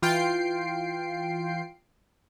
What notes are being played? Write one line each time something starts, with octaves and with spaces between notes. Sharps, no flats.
E3 F4 G5 C7 D7